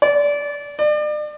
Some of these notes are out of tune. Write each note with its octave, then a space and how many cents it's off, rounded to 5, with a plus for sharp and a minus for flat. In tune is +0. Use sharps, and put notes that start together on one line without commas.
D5 -20
D5 +40